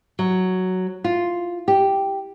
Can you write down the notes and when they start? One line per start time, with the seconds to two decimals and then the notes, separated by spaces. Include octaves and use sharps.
0.19 F#3
1.04 F4
1.68 G4